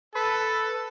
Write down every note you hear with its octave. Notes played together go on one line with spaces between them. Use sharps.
A4 B4